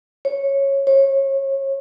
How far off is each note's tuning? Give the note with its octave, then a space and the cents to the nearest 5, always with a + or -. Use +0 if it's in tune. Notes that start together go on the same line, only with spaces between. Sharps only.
C#5 -10
C#5 -30